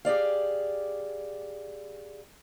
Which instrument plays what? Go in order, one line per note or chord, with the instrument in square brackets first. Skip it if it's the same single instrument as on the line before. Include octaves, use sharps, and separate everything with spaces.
[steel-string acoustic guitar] G4 G#4 D5 F5